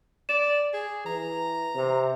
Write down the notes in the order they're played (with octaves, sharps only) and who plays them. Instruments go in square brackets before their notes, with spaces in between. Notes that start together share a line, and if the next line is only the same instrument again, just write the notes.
[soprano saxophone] D5 [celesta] E7
[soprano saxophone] G#4
[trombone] E3 [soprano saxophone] A#5
[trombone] C3